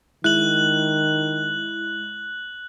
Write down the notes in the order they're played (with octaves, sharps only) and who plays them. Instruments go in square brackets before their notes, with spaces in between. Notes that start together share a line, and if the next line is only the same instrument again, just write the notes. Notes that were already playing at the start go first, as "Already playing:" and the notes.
[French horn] D#3 [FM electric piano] G#3 E4 [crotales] F#6 F#7